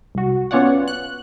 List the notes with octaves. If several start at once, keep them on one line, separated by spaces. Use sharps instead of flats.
C2 F#4
B3 C#4 F4 C#5 D5 F#5
F#6